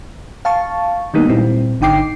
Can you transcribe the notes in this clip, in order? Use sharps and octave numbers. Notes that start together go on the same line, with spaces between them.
F5 A5 C#6
D#3 G3 G#3 A#3 B3 D#4
A#2 G3 C4 E4
G#1 D3 D#4 G5 D6 C7